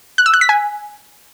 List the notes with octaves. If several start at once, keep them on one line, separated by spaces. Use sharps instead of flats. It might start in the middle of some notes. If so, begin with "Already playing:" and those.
F#6
E6
F#6
B6
G#5